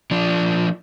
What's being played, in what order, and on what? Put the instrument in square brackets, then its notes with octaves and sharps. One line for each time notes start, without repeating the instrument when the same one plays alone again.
[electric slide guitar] F3 D4